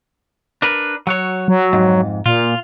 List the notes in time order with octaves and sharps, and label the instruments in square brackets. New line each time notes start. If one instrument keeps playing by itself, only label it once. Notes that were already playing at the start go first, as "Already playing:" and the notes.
[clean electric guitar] D4 A#4 B4
F#3 F#4 C#5
[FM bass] F#3
[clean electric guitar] F2 G#2
[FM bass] A#2 [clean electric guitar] F4